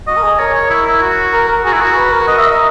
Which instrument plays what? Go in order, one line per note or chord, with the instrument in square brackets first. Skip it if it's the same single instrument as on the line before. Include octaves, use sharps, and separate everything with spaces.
[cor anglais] F#4 [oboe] D#5
[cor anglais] A#4
G#4
[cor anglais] A#4 [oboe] C#5
[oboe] C#5
E4
E4
F#4
[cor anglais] A#4
A#4
[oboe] F#4 [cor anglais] G#4
[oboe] E4
[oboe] F#4 [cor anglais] A#4
[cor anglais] B4
A#4
[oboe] D#5
E5
D#5